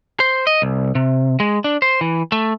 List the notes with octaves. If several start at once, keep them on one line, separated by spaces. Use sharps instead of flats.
C5
D#5
C2
C3
G#3
D4
C5
E3
A3